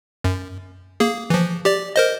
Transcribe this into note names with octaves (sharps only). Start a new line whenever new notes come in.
F#2
A#3 G#4
E3 F3
G4 D5
A#4 C5 D#5